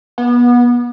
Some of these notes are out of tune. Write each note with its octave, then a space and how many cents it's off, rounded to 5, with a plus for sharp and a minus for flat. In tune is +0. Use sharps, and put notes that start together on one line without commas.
B3 -25